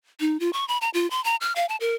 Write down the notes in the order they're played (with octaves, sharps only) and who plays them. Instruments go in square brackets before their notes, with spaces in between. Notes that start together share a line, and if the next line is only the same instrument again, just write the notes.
[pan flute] D#4
F4
C#6
B5
A#5
F4
C6
A#5
F6
F5
A5
A#4